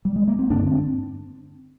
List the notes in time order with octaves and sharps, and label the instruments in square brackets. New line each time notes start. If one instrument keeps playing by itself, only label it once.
[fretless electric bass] G3
G#3
A#3
C4
G2 D3 D4
C4